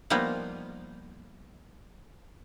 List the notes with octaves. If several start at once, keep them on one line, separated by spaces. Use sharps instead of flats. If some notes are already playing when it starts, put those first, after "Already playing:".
F3 G3 A#3 B3 D#4